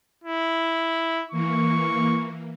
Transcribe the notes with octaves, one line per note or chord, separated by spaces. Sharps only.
E4
E3 A#3 C#6